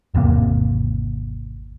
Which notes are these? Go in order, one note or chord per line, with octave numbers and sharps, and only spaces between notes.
G#1 E2 C3 A#3